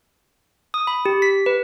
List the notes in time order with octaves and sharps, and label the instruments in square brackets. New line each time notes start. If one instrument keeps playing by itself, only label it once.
[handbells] D#6
B5
G4
B6
B4